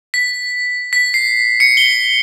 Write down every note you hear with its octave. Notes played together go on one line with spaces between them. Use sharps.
B6
B6
C7
C#7
G7